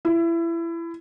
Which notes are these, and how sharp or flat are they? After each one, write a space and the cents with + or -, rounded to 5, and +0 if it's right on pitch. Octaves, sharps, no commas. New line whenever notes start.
E4 +25